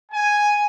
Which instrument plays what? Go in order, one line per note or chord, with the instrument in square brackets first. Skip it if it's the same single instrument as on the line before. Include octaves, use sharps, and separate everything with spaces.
[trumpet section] G#5